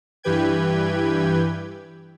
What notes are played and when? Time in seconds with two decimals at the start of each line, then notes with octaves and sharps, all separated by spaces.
0.23 G2 E3 G4 B4 G5 G#6